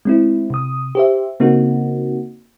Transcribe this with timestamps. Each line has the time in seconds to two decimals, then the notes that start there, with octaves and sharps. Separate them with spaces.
0.05 G#3 C4 E4
0.50 C3 D#6
0.95 G4 C5 E5
1.40 C#3 A#3 C4 D#4 F#4